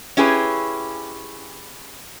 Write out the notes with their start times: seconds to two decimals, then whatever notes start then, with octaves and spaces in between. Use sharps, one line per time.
0.17 C#4 E4 G4 G#4 B4